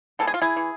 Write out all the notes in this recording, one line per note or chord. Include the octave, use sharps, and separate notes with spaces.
D3 G#3 B3 A4
G#4
F4
E4 G#4
E3